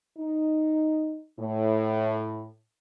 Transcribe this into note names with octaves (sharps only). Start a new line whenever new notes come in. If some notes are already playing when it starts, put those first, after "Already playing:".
D#4
A2